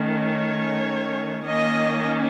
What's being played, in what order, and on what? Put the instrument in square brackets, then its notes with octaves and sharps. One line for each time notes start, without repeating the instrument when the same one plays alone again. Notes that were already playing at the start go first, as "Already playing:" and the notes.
Already playing: [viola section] D#3 A3 C#4
C#5
D#3 A#3 C#4 D#5